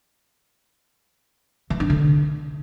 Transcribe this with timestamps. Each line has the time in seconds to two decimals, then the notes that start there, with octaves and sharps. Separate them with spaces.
1.70 E3
1.80 D4
1.90 D3